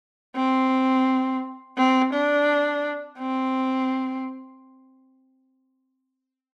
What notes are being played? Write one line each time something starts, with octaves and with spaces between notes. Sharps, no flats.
C4
C4
D4
C4